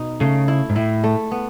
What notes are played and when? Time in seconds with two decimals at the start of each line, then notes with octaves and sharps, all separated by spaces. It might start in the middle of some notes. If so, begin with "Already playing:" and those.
Already playing: B2 D#4
0.20 C#3 A3
0.48 E4
0.70 G#2
0.75 A2 E4
1.04 A3
1.31 B3